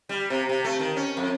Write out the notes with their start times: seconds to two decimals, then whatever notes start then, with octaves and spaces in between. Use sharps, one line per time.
0.09 G3
0.30 C3
0.49 C3
0.64 A3
0.79 D#3
0.96 C#4
1.17 F2